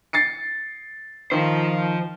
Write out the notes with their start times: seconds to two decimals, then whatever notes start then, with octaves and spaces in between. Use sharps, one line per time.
0.13 A6 C7 C#7
1.31 D#3 F3 C5